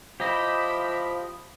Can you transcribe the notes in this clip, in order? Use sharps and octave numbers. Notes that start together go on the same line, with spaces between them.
F3 E4 G4 D#5 B5